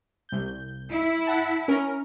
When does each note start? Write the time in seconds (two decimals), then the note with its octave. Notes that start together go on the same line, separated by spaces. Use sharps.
0.29 C2 G6
0.91 E4
1.27 F#5 A5
1.68 C#4 A#4